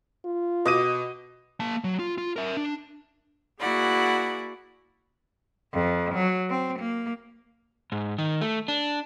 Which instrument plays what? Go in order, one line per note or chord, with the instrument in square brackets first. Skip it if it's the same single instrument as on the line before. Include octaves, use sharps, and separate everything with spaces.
[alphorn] F4
[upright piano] B2 D6 D#7 [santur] D#5
[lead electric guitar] A#3 A5
F#3
F4
F4
A#4 E5
D4
[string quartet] A#3 E4 F#4 G#4 D5 F#5
[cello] F2
F#3
C4
A#3
[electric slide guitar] G#2
D#3
A3
D4